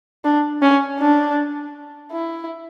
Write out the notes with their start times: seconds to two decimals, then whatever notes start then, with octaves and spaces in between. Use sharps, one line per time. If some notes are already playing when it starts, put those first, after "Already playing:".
0.24 D4
0.62 C#4
1.00 D4
2.12 E4